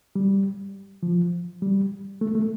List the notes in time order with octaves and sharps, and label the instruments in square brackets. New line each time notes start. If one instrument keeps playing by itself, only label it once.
[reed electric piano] G3
F3
G3
A3
A3